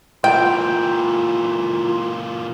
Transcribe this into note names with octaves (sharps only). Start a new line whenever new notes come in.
A#2 E3 F4 G5